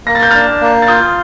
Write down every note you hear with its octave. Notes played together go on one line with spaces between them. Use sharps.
A#3 A#6
A6
G6
D4 F6 A6
A#3
A6
F4 D#6 G6